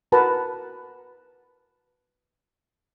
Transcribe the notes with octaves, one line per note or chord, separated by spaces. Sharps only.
F#4 A#4 B4 F#5 A5 A#5